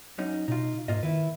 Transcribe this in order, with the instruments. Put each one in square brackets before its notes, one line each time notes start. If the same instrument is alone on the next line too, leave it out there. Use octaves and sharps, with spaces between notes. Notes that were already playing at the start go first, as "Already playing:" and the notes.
[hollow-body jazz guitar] F#2 C#4 D#4
[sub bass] B2 [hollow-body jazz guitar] D#4 F4
[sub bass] G#2 [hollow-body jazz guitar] A#3 F4 D#5
[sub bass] D#3 [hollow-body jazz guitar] E4 B4